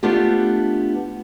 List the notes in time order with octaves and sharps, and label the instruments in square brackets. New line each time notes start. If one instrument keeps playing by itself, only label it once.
[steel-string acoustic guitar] A3 B3 D4 F4 G4